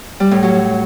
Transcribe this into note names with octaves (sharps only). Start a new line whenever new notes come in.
G3
A2
F#3